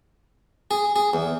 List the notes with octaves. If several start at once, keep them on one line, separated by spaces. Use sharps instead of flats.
G#4
G#4
E2